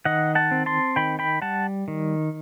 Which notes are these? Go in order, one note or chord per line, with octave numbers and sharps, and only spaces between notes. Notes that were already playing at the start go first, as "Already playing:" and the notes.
D#3 D#5 F#5
F#5 A5
C4
A5 C6
D#3 G5 B5
G5 B5
G3 F#5 A5
D#3